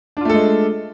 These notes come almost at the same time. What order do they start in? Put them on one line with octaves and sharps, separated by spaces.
D4 F4 A3 A4 G#3